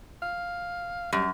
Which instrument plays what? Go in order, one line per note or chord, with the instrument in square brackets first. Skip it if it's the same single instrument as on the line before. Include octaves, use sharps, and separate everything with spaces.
[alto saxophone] F5
[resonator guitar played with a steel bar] F#2 [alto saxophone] G3